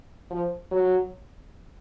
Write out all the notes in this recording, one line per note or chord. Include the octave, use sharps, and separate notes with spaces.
F3
F#3